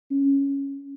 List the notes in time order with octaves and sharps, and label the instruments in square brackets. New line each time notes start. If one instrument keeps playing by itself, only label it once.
[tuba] C#4